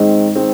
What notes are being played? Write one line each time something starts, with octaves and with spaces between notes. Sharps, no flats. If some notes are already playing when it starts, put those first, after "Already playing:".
Already playing: G#2 D#3 G#3 C4
D#3 G#3 C4